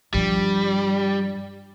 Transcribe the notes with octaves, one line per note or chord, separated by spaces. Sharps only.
G2 F3 G3